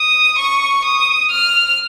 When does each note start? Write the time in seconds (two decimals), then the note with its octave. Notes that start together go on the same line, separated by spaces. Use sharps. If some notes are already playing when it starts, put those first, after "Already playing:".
Already playing: D#6
0.38 C#6
0.84 D#6
1.31 F6